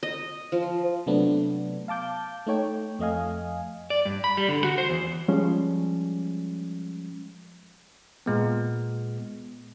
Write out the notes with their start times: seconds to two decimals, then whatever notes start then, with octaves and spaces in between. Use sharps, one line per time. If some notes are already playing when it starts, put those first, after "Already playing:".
0.03 D#5
0.52 F3
1.06 C3 F#3 A3 B3 D4
1.88 F5 A5 D6 G6
2.47 A3 D#4 C#5 G5
2.99 F2 A3 D#5 F5 G#5
3.90 D5
4.05 G2
4.24 B5
4.37 G3
4.49 D3
4.64 F#4
4.78 C5
4.90 E2
5.28 F3 G3 G#3 C#4
8.26 A#2 G#3 B3